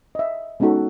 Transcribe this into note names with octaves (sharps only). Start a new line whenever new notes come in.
D#5 E5
G#3 B3 C#4 D#4 F#4 A4